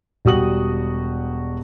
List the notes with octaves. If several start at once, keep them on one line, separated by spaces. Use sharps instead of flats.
E1 G3 F#4 D#6 F#7